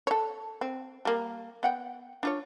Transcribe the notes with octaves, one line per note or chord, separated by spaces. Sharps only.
A4 C#5
C4
G3 A#3
B3 F#5 G5
D4 F4 C#5